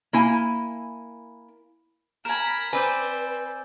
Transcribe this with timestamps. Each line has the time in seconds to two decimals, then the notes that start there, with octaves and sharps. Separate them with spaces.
0.13 A#3 E4 G#5
2.25 A#4 G#5 A#5 B5 E7
2.73 C4 B4 D5 G#5 E6 G6